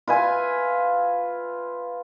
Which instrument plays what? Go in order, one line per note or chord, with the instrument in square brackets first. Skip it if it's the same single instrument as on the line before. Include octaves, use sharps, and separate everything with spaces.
[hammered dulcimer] F4 B4 E5 G#5